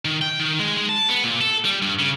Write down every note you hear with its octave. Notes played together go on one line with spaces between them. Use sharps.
D#3
G5
D#3
G#3
G#3
A5
B3
A#2
A4
G3
G2
C#3